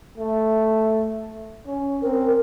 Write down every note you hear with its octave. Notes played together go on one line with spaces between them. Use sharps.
A3
C#4
C4 A#4